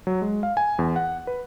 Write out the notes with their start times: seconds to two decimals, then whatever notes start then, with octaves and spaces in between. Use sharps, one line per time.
0.07 F#3
0.22 G#3
0.43 F5
0.57 G#5
0.79 E2
0.96 F#5
1.27 B4